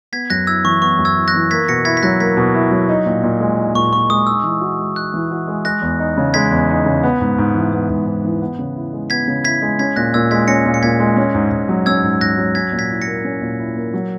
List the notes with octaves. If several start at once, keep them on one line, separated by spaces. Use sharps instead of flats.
B3 G#6 B6
F#2 F#6 A#6
E4 E6 G#6
E3 C#6
B3 C#6
F#2
E6 G#6
E4
F#6 A#6
E3
A#3 G#6 B6
B2 A#6 C#7
E4 G#6 B6
B6
F#3 F#6 A#6
A#3 G#6 B6
B2
E4
F#3
D#4
A#2
A#2
G#3
D#4
A#2 C#6
A#2 C#6
G#3 D#6
D#4 E6
E3
F#4
G#3
D#4 F#6
E3
F#4
G#3
G#3 F#6 A#6
E2
D#4
C#3
G#3 G#6 B6
E2
D#4
C#3
B3
G#2
G#2
E3
B3
G#2
G#2
E3
B3
C#3
E4
G#3
B3 G#6 B6
C#3
E4 G#6 B6
G#3
C#4 G#6 B6
A#2 F#6 A#6
A#2 E6 G#6
G#3 G#6 B6
C#4 A#6 C#7
A#2
C#7
A#2 G#6 B6
G#3
C#4
G#2
G#2
F#3
C#4 E6 G#6
G#2
G#2 F#6 A#6
F#3
C#4 G#6 B6
A#2
G#6 B6
E4
A#6 C#7
A#3
C#4
A#2
E4
A#3
F#3